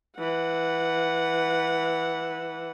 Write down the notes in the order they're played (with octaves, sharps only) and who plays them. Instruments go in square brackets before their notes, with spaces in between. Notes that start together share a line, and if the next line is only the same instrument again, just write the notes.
[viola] E3 F#5